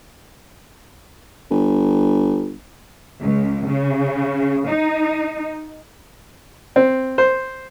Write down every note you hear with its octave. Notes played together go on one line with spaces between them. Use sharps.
G1
C#2
C#3
D#4
C4
C5